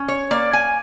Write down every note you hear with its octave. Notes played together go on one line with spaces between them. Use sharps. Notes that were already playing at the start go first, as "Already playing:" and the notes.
Already playing: C#4
C#5
A#3 D5
G#5